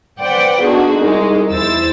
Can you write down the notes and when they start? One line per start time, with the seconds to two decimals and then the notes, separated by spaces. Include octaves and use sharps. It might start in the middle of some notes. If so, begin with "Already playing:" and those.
0.22 B4 C5 D5 F#5 G5
0.62 B2 D3 D#4 F#4 G#4
0.98 C2 G#3 D#4
1.51 E2 E4 C5 E6 A6